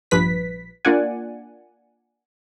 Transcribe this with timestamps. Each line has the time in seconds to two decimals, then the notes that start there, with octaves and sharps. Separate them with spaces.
0.11 A#1 G2 F3 B4 B6
0.85 A#3 D4 F4 D5 F#5 G#5